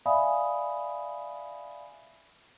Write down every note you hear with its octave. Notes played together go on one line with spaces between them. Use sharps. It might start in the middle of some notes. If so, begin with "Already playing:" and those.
D5 E5 F5 G#5 B5 D#6